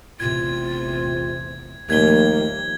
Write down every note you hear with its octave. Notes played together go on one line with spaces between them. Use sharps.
A1 E2 C3 F4 G#6
D#2 F3 G3 A3 A#3 G#6 G7